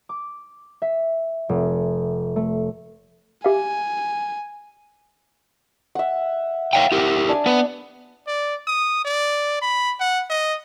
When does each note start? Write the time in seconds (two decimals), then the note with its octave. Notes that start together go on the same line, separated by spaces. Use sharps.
0.09 D6
0.82 E5
1.49 F1
2.36 A3
3.44 G4 E5 F5 G#5
5.95 E5 F#5
6.73 C#5 F5 G5
6.92 E4 G4 A#4
7.29 D4 G#5 D6
7.46 B3 B4
8.27 D5
8.67 D#6
9.05 D5
9.62 B5
10.00 F#5
10.30 D#5